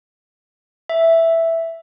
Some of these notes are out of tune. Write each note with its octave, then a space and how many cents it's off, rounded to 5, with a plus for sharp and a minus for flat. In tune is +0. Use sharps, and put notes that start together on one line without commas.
E5 +0